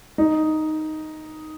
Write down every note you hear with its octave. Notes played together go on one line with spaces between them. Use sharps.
D#4